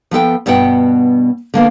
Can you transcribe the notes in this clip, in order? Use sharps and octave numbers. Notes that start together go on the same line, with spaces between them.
F3 B3 A4 G5
G2 B2 B3 F#5 G5
D3 A#3 B3